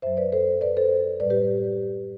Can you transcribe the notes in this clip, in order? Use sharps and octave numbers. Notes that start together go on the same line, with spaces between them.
F#2 F#3 C5 E5
B4 D5
A4 C5
B4 D5
A4 C5
A2 G3 B4 D5
G4 B4